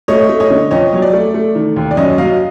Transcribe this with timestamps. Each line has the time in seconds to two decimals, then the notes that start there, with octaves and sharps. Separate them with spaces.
0.08 A3 C#5 D#5
0.29 A3
0.40 C#5 D#5
0.50 D3
0.71 F2 C#5 D#5
0.93 F#3 C#5
1.02 D5
1.13 A3
1.34 A3
1.55 D#3
1.76 D#2
1.91 D5
1.97 F#2 C#5 D#5
2.18 F#3 D#5 F5